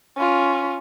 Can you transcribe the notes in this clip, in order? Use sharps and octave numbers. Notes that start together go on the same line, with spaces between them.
C#4 F4